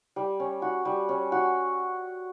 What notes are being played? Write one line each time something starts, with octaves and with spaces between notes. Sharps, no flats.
G3
C#4
F#4
G3
C#4
F#4